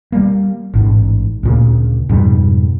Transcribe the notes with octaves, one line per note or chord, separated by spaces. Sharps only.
G3 A#3
A1 G#2
D2 A#2 C#3
F2 G#2 B2 G3